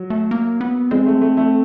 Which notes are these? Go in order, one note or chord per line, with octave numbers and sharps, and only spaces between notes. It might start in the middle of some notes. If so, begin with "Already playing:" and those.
Already playing: F#3
A3
A#3
B3
G#3 C4
A3
A3
A3